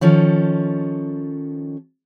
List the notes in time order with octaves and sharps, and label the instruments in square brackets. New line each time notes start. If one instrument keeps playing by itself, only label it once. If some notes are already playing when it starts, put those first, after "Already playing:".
[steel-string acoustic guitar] D#3 F3 C#4 A4